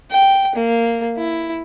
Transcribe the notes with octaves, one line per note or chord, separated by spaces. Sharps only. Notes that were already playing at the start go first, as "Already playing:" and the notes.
G5
A#3
E4